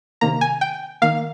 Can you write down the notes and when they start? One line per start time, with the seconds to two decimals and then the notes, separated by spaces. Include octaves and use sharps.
0.21 C3 D#3 A#3 A#5
0.41 G#5
0.61 G5
1.02 D#3 A#3 F5